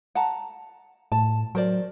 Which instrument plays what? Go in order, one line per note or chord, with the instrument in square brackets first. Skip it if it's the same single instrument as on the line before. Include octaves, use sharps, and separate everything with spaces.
[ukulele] F#5 A5 A#5
[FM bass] A2 [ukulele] A5
[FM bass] F#3 [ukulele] A#4 C5 D5